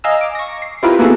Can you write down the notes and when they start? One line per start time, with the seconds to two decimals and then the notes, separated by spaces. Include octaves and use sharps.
0.04 D#5 F5 G#5 A#5 E6
0.21 D6
0.35 C#6 A#6
0.62 C7
0.83 C4 E4 F4 G4 A#4 B4
0.99 A#3 B3 E4 F#4 G#4 A4